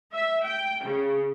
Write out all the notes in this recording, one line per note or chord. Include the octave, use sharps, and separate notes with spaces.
E5
G5
C#3